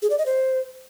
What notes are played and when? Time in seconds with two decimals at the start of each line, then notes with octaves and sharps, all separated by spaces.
0.02 G#4
0.10 D5
0.18 D#5
0.26 C5